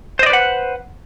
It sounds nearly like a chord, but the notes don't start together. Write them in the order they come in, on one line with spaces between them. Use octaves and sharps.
C5 D#5 D5 B4 F#5